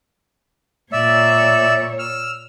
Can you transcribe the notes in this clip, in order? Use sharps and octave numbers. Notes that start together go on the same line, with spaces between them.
A#2 C#5 D5 E5 E6
E6 F6